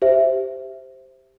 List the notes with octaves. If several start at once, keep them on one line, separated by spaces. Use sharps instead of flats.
G4 C5 E5